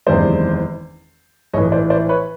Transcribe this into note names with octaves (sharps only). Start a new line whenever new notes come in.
F#1 E2 C3 D#3 G#3 C5 D5
A#1 A2 E3 C#5 D#5
C5 D5
C5 D5
B4 C#5